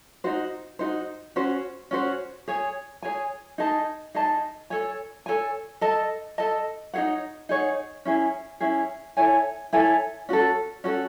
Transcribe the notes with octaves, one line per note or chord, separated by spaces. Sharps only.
D#4 F#4 C5
D#4 F#4 C5
C#4 F#4 C5
C#4 F#4 C5
G#4 C#5 G#5
G#4 C#5 G#5
D#4 G#4 D#5 A5
D#4 G#4 D#5 A5
A4 C#5 G#5
A4 C#5 G#5
A4 D#5 A5
A4 D#5 A5
D#4 G#4 C#5 F#5
D#4 G#4 C#5 F#5
C#4 E4 G#4
C#4 E4 G#4
E4 A4 C#5 G#5
E4 A4 C#5 G#5
C#4 F#4 A4
C#4 F#4 A4